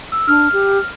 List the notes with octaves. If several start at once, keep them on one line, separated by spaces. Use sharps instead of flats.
E6
D4 F6
G4